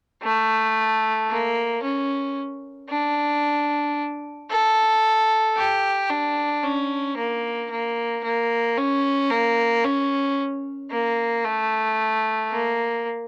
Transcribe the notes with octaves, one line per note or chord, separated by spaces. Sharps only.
A3
A#3
C#4
D4
A4
G4
D4
C#4
A#3
A#3
A#3
C#4
A#3
C#4
A#3
A3
A#3